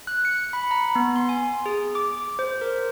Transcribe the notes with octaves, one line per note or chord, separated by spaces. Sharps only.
F#6
C#7
B5
A#5
B3
C6
G#5
G#4
D6
C5
A#4